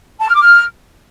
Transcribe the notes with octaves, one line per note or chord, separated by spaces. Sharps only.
A5
F6
D6
F6